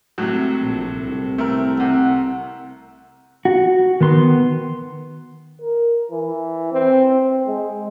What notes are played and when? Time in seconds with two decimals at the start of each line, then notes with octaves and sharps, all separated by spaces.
0.18 A2 C3 F#3
0.61 A#1
0.92 C2
1.38 A3 C4 A#4
1.80 C3 F#5
3.45 F#4
4.01 D#3 B3 C6
5.62 A#4
6.11 E3
6.73 C4
7.13 C4
7.47 G#3